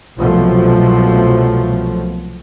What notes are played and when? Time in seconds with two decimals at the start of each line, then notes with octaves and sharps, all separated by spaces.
0.18 C2 B2 F3 F#3 A3